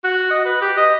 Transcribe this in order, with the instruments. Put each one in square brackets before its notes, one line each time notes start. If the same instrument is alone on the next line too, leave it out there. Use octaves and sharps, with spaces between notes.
[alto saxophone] F#4
D#5
B4
G4
D#5